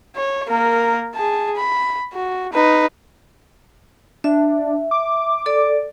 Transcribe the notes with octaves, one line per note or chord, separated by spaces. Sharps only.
C#5
A#3 A#4
G#4 A5
B5
F#4
D#4 B4
D4 E5
D6
A4 D5